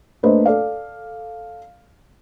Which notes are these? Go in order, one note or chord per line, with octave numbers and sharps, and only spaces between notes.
A3 A#3 D4 B4 C5 D#5
A4 D5 F5